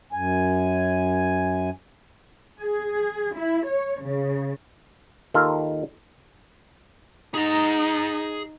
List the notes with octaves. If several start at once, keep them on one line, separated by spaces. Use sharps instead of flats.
F#2 G#5
G#4
E4
C#5
C#3
D#2 D#3 F4 A4 F5
D#4 G#4 A#5